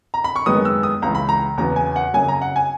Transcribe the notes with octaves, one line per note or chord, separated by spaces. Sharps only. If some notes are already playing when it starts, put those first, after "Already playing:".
A#5
B5
C#6
F#2 D#3 G#3 B3 D#6
E6
D#6
C#2 C#3 E3 A#5
B5
A#5
E2 C#3 F#3 B3 A#5
G#5
F#5
F#2 C#3 F#3 G#5
A#5
F#5
G#5